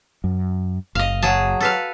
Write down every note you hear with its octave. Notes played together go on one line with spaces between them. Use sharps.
F#2
F#1 D#5 F5
F#3 G#4 A5
A4 B4 F5